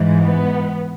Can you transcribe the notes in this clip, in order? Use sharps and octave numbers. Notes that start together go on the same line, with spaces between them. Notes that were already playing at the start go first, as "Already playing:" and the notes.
Already playing: G#2 E3
B3